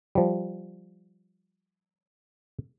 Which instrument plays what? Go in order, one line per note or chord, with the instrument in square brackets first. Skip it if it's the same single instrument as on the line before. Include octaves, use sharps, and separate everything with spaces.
[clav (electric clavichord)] F3 G3